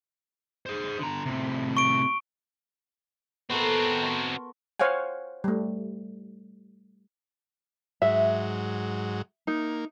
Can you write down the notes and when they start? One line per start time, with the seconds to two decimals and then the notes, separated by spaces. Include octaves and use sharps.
0.66 G#4 C5
0.99 D3 A#5
1.26 A2 C3
1.77 C#6 D7
3.50 B3 C4 F#4 A4 A#4
4.03 F#5 C6 C#6
4.80 C5 C#5 F5 F#5 G#5
5.44 G3 A3
8.02 G#2 F#3 E5
9.47 A#3 D#4